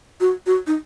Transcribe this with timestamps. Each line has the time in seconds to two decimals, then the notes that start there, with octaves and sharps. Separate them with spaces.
0.21 F#4
0.46 F#4
0.67 D#4